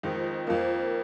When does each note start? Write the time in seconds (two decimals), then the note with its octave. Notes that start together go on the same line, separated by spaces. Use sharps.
0.03 F2 D#3 G#3 D#4
0.47 F2 F3 A#3